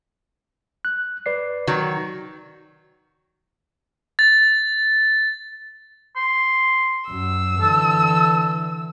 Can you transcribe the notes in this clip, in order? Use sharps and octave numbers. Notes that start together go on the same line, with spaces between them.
F#6
B4 D5 C7
D#3 F#3
A6
C6
F#2 E6
D3 E3 A4